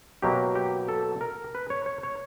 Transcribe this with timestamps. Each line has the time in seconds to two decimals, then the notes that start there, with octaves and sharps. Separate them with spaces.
0.22 B2 F#3 A#3 G4
0.55 G4
0.88 A4
1.21 A#4
1.55 B4
1.70 C#5
1.86 C#5
2.03 C#5